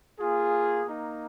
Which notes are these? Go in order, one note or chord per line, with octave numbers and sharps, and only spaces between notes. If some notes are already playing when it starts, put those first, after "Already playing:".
A#3 F4 G#4
A#3 D#4